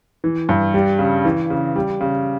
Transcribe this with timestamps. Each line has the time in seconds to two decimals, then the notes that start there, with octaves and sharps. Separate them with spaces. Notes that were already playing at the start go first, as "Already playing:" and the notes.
0.24 E3
0.49 G2
0.74 G3
0.99 C#3
1.25 E3
1.50 C#3
1.76 G3
2.01 C#3